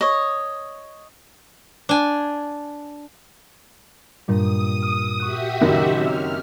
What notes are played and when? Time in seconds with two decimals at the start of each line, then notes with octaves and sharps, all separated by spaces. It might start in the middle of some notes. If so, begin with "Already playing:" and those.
0.01 C#5 D#5
1.89 D4 G#5
4.28 G2 A#2 G3 D#6
4.82 F6
5.20 F#4 G4 E5 C#6 F#6
5.61 F#1 F#2 D#3 D#5
6.00 C4 C#5 E6 F6